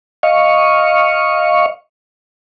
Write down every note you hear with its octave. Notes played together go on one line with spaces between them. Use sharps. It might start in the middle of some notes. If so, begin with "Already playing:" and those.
D#5 F5 C#6